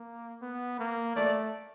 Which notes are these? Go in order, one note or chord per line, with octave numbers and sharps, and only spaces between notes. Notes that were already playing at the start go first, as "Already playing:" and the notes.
Already playing: A#3
B3
A#3
A3 D5